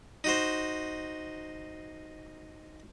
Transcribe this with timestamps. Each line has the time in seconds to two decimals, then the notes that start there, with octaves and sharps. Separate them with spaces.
0.24 D#4 F#4 C5